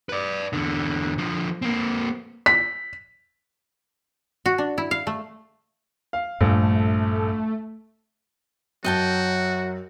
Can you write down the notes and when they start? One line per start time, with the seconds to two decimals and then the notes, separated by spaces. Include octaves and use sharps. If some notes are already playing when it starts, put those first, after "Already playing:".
0.09 B4 D5
0.53 E2 D3
1.18 D3 F3
1.62 A#3 C4
2.46 B6
4.46 F#4
4.58 D4
4.78 E4
4.91 F5
5.07 A3
6.13 F5
6.41 A#1 G2 A3
8.84 F#2 F#3 F#4 D#5 G5 A5